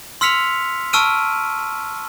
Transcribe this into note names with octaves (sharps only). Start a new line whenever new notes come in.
C6 E6 F6 B6 C#7 F7
A5 C#6 E6 F6 D7 D#7